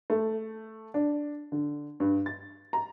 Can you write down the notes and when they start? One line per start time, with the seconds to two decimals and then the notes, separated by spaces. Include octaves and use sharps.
0.10 A3
0.94 D4
1.52 D3
2.00 G2
2.26 A6
2.73 A#5